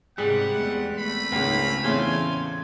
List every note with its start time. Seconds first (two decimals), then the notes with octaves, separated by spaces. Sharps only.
0.18 G#2 C3 G3 G#4 F#5
0.54 E2 G#3 A3
0.98 A3 C4 B5
1.32 C#2 G#2 C#3 A#3
1.85 E2 A2 C#3 F4 G#5